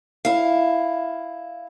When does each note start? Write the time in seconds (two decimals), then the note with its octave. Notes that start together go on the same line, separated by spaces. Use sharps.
0.25 E4 F5